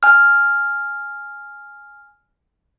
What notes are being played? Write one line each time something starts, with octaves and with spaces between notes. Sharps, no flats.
G#5 F6